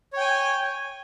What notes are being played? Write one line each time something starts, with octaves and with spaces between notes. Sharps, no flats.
C#5 G5 G#5